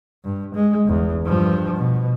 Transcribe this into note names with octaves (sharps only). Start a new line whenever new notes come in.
G2
G#3
G1 E2
G2 F3
B2